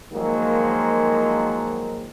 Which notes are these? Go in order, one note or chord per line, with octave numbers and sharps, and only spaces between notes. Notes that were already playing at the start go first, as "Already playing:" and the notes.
D#3 F3 F#3 G#3 A#3